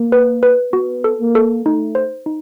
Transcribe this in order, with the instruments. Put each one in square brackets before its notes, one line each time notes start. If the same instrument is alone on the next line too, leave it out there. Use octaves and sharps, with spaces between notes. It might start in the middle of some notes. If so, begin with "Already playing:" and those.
Already playing: [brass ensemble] A#3
[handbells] B4
B4
[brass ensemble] B3 [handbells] F#4
[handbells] A4
[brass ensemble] A#3
[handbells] A4
[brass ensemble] A3 [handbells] D#4
[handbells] C5
D#4